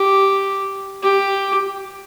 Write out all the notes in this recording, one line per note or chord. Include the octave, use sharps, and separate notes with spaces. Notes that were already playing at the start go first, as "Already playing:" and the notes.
Already playing: G4
G4